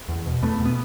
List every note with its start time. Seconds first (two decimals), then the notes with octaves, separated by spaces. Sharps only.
0.08 E2
0.26 B2
0.42 E2 A3 B3
0.60 B2
0.66 B3